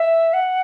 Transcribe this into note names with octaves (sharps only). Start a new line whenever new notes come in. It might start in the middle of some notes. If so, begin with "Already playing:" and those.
Already playing: E5
F#5